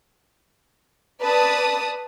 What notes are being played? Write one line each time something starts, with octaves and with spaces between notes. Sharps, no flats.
B4 D5 A5 D#6